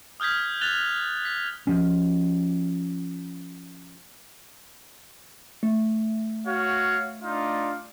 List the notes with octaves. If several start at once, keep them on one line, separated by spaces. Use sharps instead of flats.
D#6 F6 G6 G#6 B6
F#6 A6 F7 G7
B6
F3 C#4
A3
F#4 C#5 F5
D4 D#4 F4